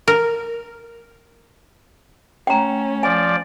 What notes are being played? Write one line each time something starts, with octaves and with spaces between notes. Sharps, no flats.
A#4
A3 C#4 G5 A#5
F3 D5 G#5